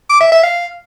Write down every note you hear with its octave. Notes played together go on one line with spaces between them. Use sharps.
D6
E5
E5
F5